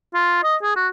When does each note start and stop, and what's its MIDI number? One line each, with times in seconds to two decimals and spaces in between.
0.14 0.39 65
0.43 0.56 75
0.62 0.74 68
0.76 0.88 66